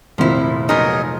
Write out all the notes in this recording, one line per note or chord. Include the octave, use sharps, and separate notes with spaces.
F1 A#2 D#3 F3 C4 E4
F#3 B3 D#4 G#4 A#4